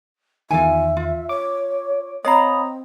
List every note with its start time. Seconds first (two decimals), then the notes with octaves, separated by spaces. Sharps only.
0.51 E2 D#3 F4 E5 G#5
0.97 F4
1.29 C#5 D6
2.25 C4 C#5 D#5 F5 A#5 B5